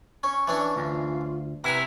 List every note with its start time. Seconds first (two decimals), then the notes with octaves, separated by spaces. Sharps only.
0.23 C#4 C#6
0.48 E3 C#4 D4
0.76 D2 F4
1.64 C3 E4 B4 F#5 G#5 A#5